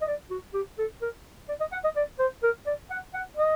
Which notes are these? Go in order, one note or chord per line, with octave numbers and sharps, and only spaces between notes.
D#5
D5
F#4
G4
A4
A#4
D5
D#5
F#5
D#5
D5
C5
A#4
D5
F#5
F#5
D#5